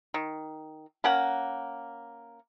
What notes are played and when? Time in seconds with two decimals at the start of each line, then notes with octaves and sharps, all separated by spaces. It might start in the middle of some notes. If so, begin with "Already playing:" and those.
0.14 D#3
1.04 A#3 C#4 A#4 F#5